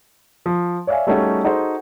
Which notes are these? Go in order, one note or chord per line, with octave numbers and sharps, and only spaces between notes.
F3
C#5 D5 E5 F5 G#5
G3 A3 C#4 D#4 F#4 G#4
D#4 F#4 G#4 A4 C5